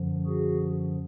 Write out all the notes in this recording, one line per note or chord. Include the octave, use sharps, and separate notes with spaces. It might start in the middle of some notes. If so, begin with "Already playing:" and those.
Already playing: F#2 D3 F3
F#4 G#4